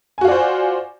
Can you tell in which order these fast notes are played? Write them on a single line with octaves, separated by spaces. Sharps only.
G#5 F#4 F4 D5 C5